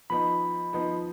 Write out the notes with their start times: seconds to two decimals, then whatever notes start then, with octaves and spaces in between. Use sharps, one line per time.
0.10 F3 B3 D#4 B5
0.73 F3 B3 D#4